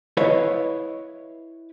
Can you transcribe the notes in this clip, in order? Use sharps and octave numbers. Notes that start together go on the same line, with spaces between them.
E4 B4 C#5 D#5 F5